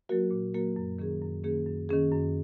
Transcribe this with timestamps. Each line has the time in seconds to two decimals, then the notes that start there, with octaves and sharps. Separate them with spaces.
0.09 F#3 A#3 F#4 A#4
0.31 A#2
0.54 F#3 A#3 F#4 A#4
0.76 F#2
0.99 D#3 A#3 C#4 G#4
1.22 F#2
1.44 D#3 A#3 C#4 G#4
1.66 F#2
1.89 D#3 A#3 C#4 G#4
2.12 F#2